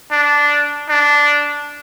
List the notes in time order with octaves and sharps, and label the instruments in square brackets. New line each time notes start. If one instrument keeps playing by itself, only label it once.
[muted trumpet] D4
D4